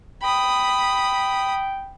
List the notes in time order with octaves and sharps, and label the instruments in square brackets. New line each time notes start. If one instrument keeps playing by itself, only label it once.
[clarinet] G5 [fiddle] B5 D#6